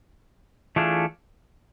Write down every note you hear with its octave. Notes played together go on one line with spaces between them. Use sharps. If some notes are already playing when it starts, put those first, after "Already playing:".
E3 A3 D4 F4 G#4